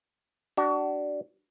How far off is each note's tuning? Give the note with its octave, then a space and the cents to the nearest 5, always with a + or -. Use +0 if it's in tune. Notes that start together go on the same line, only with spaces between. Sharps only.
D4 +0 F#4 +35